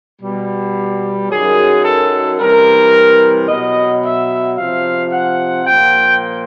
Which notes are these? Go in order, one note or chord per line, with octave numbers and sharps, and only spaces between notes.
B2 G3
F#2 D#3 F#3 G#4
A4
C3 E3 G3 A#4
B2 F#3 D#5
E5
C3 F3 F5
F#5
A#2 F3 G5